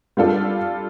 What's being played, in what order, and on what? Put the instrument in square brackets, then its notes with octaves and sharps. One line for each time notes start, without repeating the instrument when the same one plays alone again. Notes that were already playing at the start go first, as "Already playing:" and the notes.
[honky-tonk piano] G3 D4 F4 A4